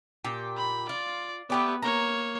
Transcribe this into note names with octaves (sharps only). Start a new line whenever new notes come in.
A#2 G4
B5
F4 D5
A3 B3 G4 B4 D5
A#3 C#5 A#5